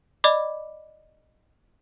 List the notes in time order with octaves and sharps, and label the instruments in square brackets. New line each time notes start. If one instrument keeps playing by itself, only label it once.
[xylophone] D5 D#5 B5 D6